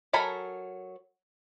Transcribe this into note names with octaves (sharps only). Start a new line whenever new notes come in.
F#3 A4 A#4 G#5 B5